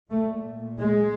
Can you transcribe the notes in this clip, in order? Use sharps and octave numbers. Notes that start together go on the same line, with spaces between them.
A#2 A3
G#3